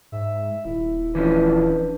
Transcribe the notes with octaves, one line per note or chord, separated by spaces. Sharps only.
G#2 E5
D#1 E4
E3 F3 C#4 D4 E4 B4